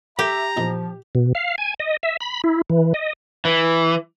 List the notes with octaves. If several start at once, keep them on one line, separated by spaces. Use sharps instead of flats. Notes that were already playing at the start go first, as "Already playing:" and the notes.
G4 A4 A#4 E5 A#5
E2 A#2 D#3 F3
B2
F5
G#5
D#5
E5
B5
E4
E3
D#5
E3